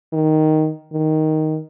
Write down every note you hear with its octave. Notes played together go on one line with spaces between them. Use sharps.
D#3
D#3